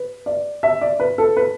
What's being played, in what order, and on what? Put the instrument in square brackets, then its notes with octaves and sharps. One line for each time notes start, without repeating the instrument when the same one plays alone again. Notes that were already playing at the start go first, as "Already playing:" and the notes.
Already playing: [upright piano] B4
D5
E5
D5
B4
A4
B4